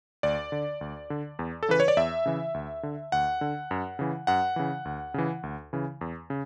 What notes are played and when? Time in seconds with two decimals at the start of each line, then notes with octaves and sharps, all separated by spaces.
0.23 D2 D5
0.52 D3
0.81 D2
1.10 D3
1.39 E2
1.63 A4
1.69 C#3 E3 B4
1.80 C#5
1.88 D5
1.97 E2 E5
2.26 C#3 E3
2.54 D2
2.83 D3
3.12 D2 F#5
3.41 D3
3.71 F#2
3.99 C#3 E3
4.27 F#2 F#5
4.56 C#3 E3
4.85 D2
5.14 C#3 E3
5.43 D2
5.73 C#3 E3
6.01 E2
6.30 C#3